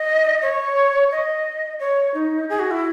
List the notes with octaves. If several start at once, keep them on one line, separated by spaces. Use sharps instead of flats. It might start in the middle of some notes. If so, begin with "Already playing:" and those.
Already playing: D#5
C#5
D#5
C#5
D#4
G#4
F#4
E4